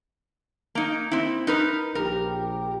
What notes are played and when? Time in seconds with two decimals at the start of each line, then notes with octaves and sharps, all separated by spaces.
0.75 A#3 D#4
1.12 C4 E4
1.47 D#4 A#4 B4
1.95 A#1 G4 A#4